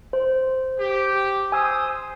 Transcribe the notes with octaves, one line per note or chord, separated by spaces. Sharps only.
C5
G4
C5 G#5 D#6 E6